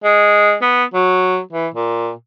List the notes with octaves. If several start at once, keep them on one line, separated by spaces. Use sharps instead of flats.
G#3
B3
F#3
E3
A#2